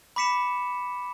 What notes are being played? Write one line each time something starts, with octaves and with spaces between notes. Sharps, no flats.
B5 D6 B6 C#7 E7